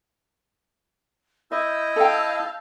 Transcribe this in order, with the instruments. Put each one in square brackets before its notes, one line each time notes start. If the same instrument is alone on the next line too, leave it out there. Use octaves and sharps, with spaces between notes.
[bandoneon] E4 D#5 [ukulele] E5 [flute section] E6 G6
[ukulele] A4 G5 [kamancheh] F5 A5